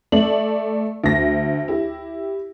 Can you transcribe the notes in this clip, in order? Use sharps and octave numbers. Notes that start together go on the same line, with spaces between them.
A3 D5 F#7
D2 A#6
E4 G4